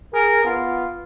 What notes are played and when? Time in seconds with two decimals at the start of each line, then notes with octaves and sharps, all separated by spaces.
0.13 G#4 A#4
0.45 B3 F4